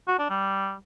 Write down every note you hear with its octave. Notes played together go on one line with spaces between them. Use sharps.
F#4
D4
G3